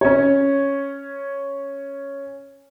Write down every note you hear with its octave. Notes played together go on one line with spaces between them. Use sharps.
C#4 C#5